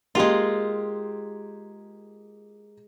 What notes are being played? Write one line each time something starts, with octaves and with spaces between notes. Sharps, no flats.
G#3 A#3 F4 G4